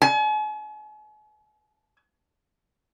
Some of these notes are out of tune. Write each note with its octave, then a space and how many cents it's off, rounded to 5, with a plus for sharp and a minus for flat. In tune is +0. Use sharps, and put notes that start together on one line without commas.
G#5 +45